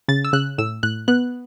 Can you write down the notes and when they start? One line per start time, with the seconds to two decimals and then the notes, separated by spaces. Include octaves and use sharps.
0.08 C#3 A6
0.25 E6
0.33 C#3 F#6
0.58 A2 E6
0.83 A2 F#6
1.08 B3 F#6